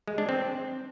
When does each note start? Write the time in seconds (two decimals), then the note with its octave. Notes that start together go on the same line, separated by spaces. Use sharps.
0.08 G#3
0.18 D4
0.29 C4